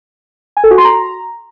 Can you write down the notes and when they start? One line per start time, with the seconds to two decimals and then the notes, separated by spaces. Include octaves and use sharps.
0.57 G#5
0.64 A4
0.71 F#4
0.78 C6
0.85 A#5